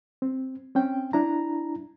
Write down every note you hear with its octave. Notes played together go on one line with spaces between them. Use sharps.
C4
C4 C#4 G5
D4 E4 A#5